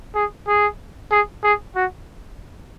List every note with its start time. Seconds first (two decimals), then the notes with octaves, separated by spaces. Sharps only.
0.15 G#4
0.48 G#4
1.11 G#4
1.43 G#4
1.75 F#4